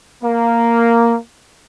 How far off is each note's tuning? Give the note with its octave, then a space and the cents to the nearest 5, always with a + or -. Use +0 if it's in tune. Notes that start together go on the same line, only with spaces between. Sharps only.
A#3 -5